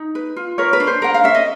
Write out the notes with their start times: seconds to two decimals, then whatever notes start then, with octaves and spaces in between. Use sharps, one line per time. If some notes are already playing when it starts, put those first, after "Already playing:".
Already playing: D#4
0.15 B4
0.36 F4
0.58 A#4 B4 C#5
0.73 B4
0.80 D4
0.87 C5
1.02 A#4 F#5
1.14 F5
1.24 C#4 E5
1.35 D#5